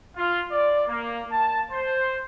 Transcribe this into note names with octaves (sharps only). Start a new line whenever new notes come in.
F4
D5
A#3
A5
C5